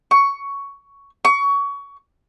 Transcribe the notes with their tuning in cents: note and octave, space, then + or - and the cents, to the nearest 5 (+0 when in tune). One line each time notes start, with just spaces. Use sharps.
C#6 +10
C#6 +25